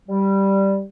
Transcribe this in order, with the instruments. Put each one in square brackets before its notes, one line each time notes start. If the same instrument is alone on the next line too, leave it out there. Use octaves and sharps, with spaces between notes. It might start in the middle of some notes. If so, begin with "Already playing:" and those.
[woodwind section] G3